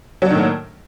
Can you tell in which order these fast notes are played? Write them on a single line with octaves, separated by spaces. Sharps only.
F#3 D4 D#3 A2 A#3